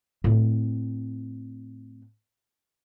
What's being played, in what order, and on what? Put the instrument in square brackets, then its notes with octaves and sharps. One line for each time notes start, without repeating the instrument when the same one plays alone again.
[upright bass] A2 C4